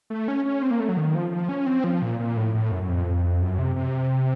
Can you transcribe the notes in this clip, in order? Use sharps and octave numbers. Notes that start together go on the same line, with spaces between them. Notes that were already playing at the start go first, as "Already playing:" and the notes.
A3
C#4
C#4
C4
A#3
A3
F#3
D#3
F3
F3
C#4
C4
F3
A#2
A#2
A2
A2
F#2
F#2
F2
F#2
C3
C3